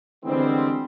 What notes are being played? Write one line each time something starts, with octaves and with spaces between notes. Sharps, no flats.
D3 E3 G3 G#3 B3 C4